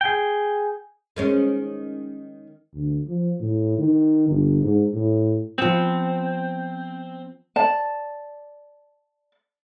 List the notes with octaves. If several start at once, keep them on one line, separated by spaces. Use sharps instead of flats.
G#4 G5
D#3 G#3 C#4
D2
F3
A2
D#3
G1
G#2
A2
F3 B3 C4
D5 A5